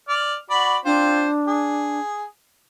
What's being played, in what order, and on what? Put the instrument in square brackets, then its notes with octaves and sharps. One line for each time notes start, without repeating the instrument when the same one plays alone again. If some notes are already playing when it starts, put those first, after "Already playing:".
[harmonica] D5 F6
F#4 D5 B5
[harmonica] C4 F4 C5 [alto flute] D4
[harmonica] G#4